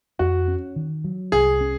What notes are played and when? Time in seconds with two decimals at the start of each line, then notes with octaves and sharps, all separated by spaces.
0.19 F2 F#4
0.48 C#4
0.76 D#3
1.04 F#3
1.32 C2 G#4
1.61 C#4